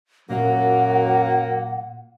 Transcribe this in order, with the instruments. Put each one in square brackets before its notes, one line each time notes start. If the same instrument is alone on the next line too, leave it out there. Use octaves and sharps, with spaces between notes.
[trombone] F#2 [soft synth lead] A#2 [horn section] F#3 A#3 [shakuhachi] F#5